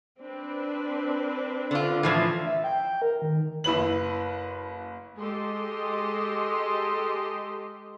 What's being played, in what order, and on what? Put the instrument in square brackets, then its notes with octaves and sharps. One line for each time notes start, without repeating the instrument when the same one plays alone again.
[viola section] C4 D4 B4
[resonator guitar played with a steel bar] D3 F4
A2 E3 F3
[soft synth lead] E5
G5
A#4
D#3
[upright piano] F#1 E4 B4 F#7
[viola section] G#3 G4 A4 D#5 C6